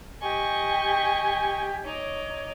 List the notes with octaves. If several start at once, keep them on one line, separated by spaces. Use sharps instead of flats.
G4 D#5 G#5 C#6
D#4 C#5 D6